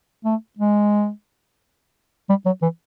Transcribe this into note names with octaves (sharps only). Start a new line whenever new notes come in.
A3
G#3
G3
F#3
E3